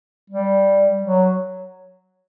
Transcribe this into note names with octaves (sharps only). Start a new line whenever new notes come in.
G3
F#3